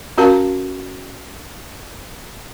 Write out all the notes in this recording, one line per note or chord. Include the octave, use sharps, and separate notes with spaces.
C#4 F#4 A#4 F5 A5